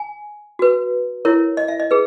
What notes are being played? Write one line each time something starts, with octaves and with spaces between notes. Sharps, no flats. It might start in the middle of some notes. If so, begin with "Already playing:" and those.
Already playing: G#5
F#4 B4
E4 A#4 C#5
D#5
E5
D#5
G#4 B4